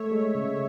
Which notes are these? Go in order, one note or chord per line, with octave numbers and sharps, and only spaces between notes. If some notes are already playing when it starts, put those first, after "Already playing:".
Already playing: A3 C#5 E5
G#3
C#3